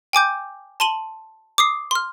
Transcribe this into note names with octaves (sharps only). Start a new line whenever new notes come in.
G5 G#5 D6 G6
A5 C6 D#7 F#7 G7
D6 D#6 C7
C6 F6